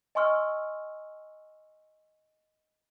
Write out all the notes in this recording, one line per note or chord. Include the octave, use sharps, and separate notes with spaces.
D#5 G#5 C6 C#6 E6 F6